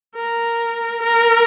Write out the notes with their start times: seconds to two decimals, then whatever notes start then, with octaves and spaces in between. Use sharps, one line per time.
0.16 A#4
1.02 A#4